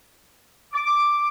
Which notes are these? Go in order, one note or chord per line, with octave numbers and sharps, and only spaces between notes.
D6